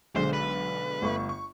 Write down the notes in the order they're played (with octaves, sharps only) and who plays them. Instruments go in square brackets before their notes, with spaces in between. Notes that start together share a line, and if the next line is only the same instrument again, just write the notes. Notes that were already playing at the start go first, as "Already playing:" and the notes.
[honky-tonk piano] B1 D3 G#3 [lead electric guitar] C5
[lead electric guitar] B4
[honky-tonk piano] G1 A3 C#6
C#6